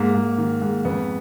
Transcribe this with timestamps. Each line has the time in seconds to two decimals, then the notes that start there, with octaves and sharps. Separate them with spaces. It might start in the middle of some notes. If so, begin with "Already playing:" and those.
Already playing: G#2 A#3
0.15 G#2
0.38 D#3
0.62 G#2
0.85 F2 B3